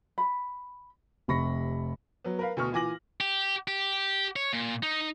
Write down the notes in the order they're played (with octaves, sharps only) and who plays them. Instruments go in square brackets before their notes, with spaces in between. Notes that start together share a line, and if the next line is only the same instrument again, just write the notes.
[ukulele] B5
[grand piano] F1 C3 B5 C#6 A#6 C#7
[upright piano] F#3 B3
A#4 B4 F5
D2 B2 C#6 F6
A#2 E3 G#5 D6 A#6 F#7
[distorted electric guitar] G4
G4
C#5
A#2
D#4